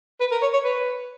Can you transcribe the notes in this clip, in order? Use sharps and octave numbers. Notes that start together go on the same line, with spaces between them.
B4
A#4
C#5
C#5
B4